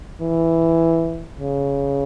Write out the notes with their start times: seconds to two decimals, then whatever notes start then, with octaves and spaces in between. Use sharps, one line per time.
0.21 E3
1.39 C#3